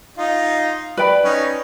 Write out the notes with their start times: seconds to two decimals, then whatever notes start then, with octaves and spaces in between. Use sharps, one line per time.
0.18 D#4 F4
0.97 B4 D5 G5 B5
1.25 C#4 D#4